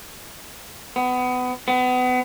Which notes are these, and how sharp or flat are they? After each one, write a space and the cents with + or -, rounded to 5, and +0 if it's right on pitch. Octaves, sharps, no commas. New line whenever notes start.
B3 +25
B3 +30